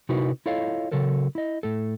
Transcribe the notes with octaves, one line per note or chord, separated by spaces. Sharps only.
C3 D#4 E4 F#4 A#4 B4
E4 F4 A4 C#5 D#5 F5
C#3 F#3 A4 A#4
E4 D#5
A2 A4